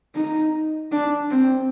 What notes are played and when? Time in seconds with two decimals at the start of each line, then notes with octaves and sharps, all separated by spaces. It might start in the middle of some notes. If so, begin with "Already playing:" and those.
0.15 D#4
0.92 D4
1.31 C4